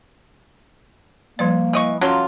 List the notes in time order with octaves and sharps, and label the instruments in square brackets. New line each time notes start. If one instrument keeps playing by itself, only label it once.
[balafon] F3 G3 D5 [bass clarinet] A#3
[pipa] E3 D#5 C#6
[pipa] F#3 A#3 F4 [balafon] C#4 C6